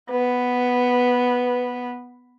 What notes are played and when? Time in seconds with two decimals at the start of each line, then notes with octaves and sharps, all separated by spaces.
0.10 B3 B4